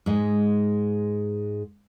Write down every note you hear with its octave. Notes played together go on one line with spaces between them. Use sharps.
G#2 G#3